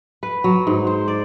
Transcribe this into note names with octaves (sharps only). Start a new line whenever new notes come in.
B4
F#3
G#2
C5
D5